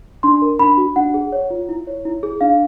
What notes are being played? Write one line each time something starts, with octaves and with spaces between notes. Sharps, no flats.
D4 C6
A#4
D4 B5
F#4
D4 F#5
G#4
C#5
F4
E4
C#5
E4
G#4
D4 F5